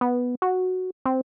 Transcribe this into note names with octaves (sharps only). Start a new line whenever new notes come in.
B3
F#4
C4